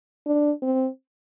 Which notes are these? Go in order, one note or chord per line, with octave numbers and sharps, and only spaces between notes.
D4
C4